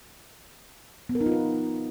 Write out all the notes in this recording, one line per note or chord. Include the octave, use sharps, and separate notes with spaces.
B3
A#4
D#4
F4
B4